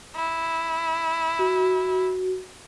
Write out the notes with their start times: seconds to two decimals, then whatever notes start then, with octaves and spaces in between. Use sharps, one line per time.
0.16 E4
1.39 F#4